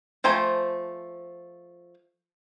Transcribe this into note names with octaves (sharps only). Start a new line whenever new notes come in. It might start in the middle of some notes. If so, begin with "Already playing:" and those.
F3 A3 C5 G#5 A#5